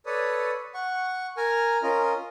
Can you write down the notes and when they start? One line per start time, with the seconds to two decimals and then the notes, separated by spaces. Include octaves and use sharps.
0.06 A4 B4 C#5 D5 D#6
0.74 F#5 C#6
1.37 A#4 G#5 A#5 F6
1.83 C#4 F4 A#4 D#5